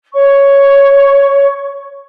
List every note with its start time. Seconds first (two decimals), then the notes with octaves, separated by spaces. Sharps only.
0.13 C#5 C#6